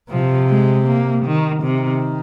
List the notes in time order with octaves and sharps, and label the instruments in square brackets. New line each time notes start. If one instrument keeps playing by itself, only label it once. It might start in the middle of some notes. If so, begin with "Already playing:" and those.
[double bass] C3 [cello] F3
[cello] G#3
A#3
D#3
[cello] C3 [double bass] D#3